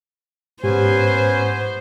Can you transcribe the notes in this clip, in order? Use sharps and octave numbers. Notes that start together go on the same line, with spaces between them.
G#2 B3 C#4 G4 C5 G#5